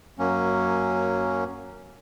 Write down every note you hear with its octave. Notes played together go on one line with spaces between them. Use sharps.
F#2 F#3 A#3 C#4